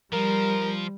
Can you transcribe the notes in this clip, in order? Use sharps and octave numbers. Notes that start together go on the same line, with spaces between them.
F3 G3 A#4